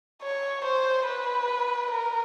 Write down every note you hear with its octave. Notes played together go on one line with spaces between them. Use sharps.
C#5
C5
B4
A#4